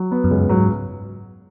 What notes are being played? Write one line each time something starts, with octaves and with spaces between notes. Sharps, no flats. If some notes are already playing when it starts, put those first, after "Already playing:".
Already playing: F#3
B3
F#2
C#2
G#2 F#3